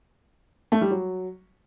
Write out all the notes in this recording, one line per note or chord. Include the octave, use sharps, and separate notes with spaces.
A3
G3
F#3